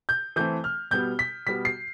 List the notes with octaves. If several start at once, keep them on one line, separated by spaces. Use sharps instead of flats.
G6
E3 A3 C4 G6
F6
B2 G3 B3 G6
B6
B2 G3 B3 B6
C7